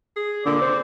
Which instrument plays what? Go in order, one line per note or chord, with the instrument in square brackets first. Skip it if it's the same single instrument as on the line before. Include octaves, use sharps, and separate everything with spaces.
[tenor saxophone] G#4
[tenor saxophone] A#2 [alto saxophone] D3 [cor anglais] D5
[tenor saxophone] C4 [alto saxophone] C5